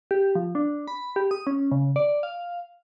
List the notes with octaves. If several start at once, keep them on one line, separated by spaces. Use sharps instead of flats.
G4
F3
D4
B5
G4
D#6
C#4
C#3
D5
F5